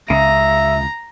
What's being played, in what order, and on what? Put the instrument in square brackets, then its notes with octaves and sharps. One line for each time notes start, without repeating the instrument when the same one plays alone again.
[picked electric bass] C#2 [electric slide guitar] C#3 [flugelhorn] E5 [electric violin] A#5